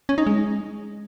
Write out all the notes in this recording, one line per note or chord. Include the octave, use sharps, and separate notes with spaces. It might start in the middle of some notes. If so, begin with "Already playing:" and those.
C#4
D#4
G#3